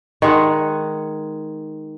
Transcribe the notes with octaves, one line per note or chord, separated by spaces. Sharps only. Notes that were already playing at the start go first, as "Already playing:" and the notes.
D#3 G#3 F#5